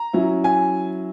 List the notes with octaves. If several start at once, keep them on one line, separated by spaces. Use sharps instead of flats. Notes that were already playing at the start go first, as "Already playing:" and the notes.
Already playing: A#5
F#3 C#4 E4
G#5